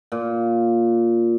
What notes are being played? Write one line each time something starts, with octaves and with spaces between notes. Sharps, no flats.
A#2